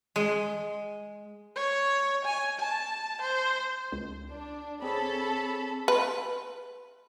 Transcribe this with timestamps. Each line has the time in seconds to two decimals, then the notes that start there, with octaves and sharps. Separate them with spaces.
0.16 G#3
1.56 C#5
2.25 G#5
2.60 A5
3.22 C5
3.92 C#2
4.29 D4
4.82 C4 G#4 A4 C#5 B5
5.88 B4